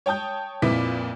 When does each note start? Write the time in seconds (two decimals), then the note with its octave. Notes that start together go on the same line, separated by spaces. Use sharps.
0.06 C#5 G5 A5 D#6 G6
0.62 F2 A#2 E4 B4 D6 B6